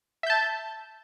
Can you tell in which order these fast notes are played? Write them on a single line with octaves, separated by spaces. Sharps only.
E5 G6 A5